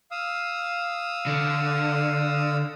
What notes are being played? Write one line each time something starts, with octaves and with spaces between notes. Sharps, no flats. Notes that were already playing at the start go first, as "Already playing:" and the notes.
F5 D#6 E6
D3